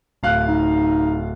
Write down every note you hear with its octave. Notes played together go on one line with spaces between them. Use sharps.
D1 F5 F#6
D#4